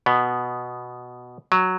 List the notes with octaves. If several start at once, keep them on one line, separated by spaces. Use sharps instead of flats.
B2 B3
F#3